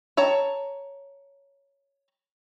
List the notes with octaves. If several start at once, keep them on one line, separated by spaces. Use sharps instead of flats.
C#5 A5 A#5